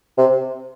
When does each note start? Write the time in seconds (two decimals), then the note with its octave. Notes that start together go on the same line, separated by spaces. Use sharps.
0.18 C3